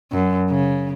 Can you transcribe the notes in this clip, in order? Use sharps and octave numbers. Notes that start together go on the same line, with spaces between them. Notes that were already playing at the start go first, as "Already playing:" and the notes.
F#2
C#3